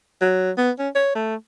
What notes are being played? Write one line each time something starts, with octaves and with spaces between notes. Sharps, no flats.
F#3
B3
C#4
C#5
A3